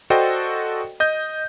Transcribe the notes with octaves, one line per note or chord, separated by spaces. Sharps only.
F#4 A4 C5 D5 D#5 G5
D#5 G6